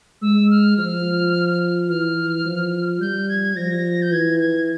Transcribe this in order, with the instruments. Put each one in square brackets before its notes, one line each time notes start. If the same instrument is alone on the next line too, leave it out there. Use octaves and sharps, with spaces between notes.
[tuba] G#3 [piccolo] E6
[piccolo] F6
[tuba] F3 [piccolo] F6
[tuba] E3 [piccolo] F6
[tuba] F3
[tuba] G3 [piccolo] G6
[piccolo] G#6
[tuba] F3 [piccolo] A#6
[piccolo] G6
[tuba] E3 [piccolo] G#6
[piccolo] G#6